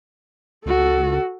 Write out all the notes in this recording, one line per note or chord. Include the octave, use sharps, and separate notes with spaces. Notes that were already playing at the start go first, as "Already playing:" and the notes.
C#2 F#4 A4